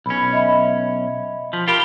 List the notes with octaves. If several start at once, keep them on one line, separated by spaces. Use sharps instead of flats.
B1 C#4 B5
D#5 E5 B5
F3 B6
F4 G4 A#4 A5 B5